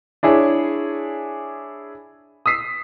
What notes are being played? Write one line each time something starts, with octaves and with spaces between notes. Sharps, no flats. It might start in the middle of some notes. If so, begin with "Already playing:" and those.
D4 E4 G#4 C#5
D#6 E6 B6 C7